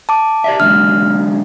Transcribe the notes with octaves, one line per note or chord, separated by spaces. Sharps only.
A5 D6
G4 D5 E5
D3 F#3 G#3 F6